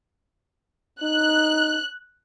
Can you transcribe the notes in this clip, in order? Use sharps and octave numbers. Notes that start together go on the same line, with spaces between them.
D#4 F#6